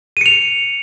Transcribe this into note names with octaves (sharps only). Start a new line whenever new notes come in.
C#7 D#7 F7